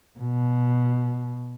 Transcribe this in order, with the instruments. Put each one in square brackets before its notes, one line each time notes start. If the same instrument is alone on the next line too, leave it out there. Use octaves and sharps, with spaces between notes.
[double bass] B2